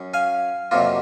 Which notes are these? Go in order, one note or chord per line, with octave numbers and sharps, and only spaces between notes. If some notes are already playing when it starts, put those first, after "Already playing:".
Already playing: F#2 C#4
F5 G#5
F2 C3 F#3 A#3 F4